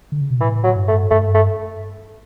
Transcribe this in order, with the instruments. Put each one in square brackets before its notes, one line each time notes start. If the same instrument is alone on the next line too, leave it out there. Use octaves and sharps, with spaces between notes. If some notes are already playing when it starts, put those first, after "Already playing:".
[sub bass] D3
C#3
B2
[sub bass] A2 [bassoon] E3
[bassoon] F#3
[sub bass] G2
[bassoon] A3
[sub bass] G2 [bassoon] A3
[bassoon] A3